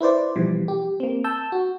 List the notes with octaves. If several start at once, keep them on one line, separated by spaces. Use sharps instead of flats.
E4 B4 C5 D5
B2 E3 F3 G3
G4
A#3 C4
A5 E6 G6
F#4